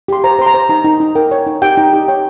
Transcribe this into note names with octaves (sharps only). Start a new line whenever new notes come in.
G4 C6
C5 A#5
C5 C6
A#5
C5
D#4 A#5
D#4
D#4
A#4 G5
C#5
D#4
G4 G5
D#4
G4
C#5 G5